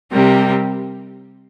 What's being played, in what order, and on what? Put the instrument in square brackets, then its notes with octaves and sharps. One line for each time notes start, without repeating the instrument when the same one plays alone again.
[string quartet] C3 G3 C4 G4 A#4